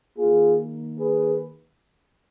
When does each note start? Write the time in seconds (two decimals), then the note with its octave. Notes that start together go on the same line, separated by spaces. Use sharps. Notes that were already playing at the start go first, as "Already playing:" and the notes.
0.17 A#3 F4 G#4
0.23 D#3
0.99 G#4 B4